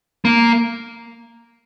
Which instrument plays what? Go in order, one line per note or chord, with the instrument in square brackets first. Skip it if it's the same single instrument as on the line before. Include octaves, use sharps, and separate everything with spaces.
[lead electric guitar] A#3